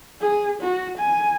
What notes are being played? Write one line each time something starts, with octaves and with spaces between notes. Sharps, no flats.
G#4
F#4
G#5